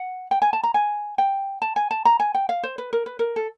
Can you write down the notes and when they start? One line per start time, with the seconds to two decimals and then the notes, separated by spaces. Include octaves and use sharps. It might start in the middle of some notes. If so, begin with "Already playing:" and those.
Already playing: F#5
0.31 G5
0.42 G#5
0.53 A5
0.63 A#5
0.74 G#5
1.18 G5
1.62 A5
1.76 G#5
1.91 A5
2.05 A#5
2.20 G#5
2.35 G5
2.49 F5
2.63 C5
2.78 B4
2.93 A#4
3.06 B4
3.19 A#4
3.36 A4